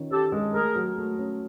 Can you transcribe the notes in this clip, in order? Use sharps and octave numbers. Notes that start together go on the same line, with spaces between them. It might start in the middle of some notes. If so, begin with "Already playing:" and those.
Already playing: D#3 C#4 F4
C#4 G4 A4
G#3
A3 G#4 A#4
F#3
A3
C#4